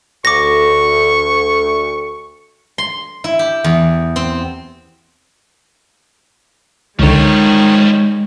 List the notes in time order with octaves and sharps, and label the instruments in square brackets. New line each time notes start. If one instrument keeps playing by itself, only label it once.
[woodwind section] D2 [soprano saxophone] C#6 [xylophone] D6 A#6
[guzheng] C6
E4
G4
E2
C4
[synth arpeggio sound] C#2 D3 [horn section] D#3 C#5 [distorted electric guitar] F3 G3 [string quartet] G#3